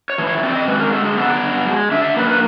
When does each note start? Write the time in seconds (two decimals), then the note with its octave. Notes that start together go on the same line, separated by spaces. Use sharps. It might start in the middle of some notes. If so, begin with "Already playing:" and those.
0.10 C#5
0.18 E3
0.27 C#5
0.38 C#5
0.43 C4 D5
0.55 D#5
0.68 G#3 B4
0.79 A#4
0.92 D3 A4
1.05 G#4
1.17 B3 A4
1.30 D5
1.42 G2
1.67 G#3
1.92 D4 E5
2.04 E5
2.17 A#3 B4
2.29 B4